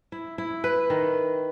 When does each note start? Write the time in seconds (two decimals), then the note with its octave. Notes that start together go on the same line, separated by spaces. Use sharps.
0.12 E4
0.38 E4
0.64 B4
0.90 D#3